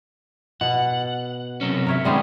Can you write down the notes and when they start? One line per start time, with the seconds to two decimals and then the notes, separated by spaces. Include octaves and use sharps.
0.61 B2 F#5
1.61 C3 F#3 C#4
1.86 A#4 C#5 E5
2.05 D#3 G3 G#3 B3 C4 G#4